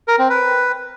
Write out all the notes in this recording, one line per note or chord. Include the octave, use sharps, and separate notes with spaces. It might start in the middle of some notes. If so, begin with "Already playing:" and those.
A#4
C4
B4